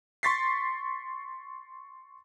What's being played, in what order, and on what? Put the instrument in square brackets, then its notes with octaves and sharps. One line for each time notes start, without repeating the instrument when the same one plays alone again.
[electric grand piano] C6 C#6 A6 B6 C7